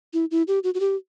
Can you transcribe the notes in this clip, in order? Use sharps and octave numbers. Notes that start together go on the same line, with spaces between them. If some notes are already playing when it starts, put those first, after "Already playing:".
E4
E4
G4
F#4
F#4
G4